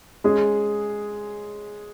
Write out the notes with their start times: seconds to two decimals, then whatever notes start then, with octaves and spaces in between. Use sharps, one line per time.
0.24 G#3 C#4 G#4